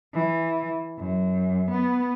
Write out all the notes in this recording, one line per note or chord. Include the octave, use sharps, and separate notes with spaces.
E3
F#2
B3